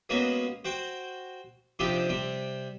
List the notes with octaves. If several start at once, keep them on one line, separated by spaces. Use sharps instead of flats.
F#3 G#3 A#3 B3 C#4 F#4
F#4 C5 G5
C3 F3 C4 D4 D#4 G4
C3 G3 C4